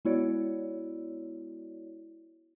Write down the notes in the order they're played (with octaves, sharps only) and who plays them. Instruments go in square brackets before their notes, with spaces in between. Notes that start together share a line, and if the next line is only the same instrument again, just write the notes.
[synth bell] G#3 B3 E4 F#4 C#5 D5